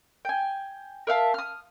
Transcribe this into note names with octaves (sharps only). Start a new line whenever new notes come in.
G5 G#5
A#4 E5 F5 A5
D#6 F6